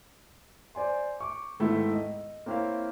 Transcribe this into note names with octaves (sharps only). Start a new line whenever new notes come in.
C5 D5 G#5 C6
C#6 D6
G#2 D#3 A3 B3 E4
D#5
A#3 C4 E4 A#4 C#5 F5